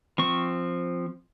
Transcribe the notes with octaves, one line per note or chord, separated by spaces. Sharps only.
F3 C4 C#6